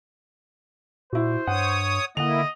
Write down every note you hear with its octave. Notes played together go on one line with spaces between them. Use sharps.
A#2 E4 F#4 C5
G2 C#5 F#5 D#6
D3 A#3 E4 D#5 F#5 F7